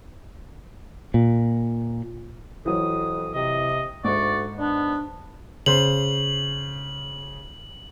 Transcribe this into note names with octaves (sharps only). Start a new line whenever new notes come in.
A#2
F2 E3 F#3 C#5 D#6
C3 D#5
D2 G#2 D5 C#6
B3 D4
C#3 C5 F#7